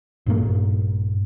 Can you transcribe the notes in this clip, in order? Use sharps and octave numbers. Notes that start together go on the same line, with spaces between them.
A#1 G2 A#3